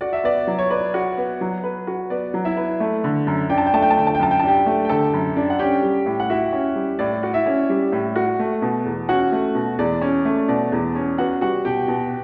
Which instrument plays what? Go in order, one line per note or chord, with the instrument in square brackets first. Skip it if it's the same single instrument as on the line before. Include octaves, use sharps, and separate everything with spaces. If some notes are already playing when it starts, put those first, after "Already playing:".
[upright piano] F#4 [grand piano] D5
[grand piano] E5
[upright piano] B3 [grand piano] D5
[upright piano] F#3
[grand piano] C#5
[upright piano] B4 [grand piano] D5
[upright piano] F#4
B3
F#3
B4
F#4
[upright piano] B3 [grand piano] D5
[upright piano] F#3
[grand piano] E4 E5
[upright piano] B4
A3
D3
F#2
[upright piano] D4 [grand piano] G5
[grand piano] A5
G5
[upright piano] A3 [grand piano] A5
[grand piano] G5
A5
[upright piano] D3 [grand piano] G5
[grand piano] A5
G5
[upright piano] F#2 [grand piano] A5
[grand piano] G5
A5
[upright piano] D4 [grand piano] G4 G5
[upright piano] A3
[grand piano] G5
[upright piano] D3 [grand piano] A4 A5
[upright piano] F#2
D4
[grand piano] F#5
[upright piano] C#4 [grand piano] G4 G5
[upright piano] G3
A2
[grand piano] F#5
[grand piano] E4 E5 [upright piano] F#4
[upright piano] C#4
G3
[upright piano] A2 [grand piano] D5
[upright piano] F#4
[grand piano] E4 E5
[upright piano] C#4
G3
A2
F#4
A3
B2
E2
[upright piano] C#4 [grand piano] F#4 F#5
[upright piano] A3
B2
[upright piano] E2 [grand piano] D5
[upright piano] C#4
A3
[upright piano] B2 [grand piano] D5
[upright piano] E2
C#4
[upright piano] B3 [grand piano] F#4 F#5
[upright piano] G3 [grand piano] F#4 F#5
[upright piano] B2 [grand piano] G4 G5
[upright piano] B2